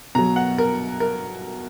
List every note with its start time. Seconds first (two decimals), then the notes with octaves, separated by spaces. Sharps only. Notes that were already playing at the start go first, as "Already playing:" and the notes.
0.15 B2 F#3 A#5
0.36 F#5
0.58 A#4
1.00 A#4